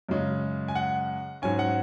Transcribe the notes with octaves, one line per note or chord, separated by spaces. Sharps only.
F#2 C#3 G#3 C#4
G#5
F#5
G#2 F#3 C#4 G#5
F#5